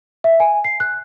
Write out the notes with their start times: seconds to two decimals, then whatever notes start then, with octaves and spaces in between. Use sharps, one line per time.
0.24 E5
0.40 G#5
0.64 C7
0.80 F#6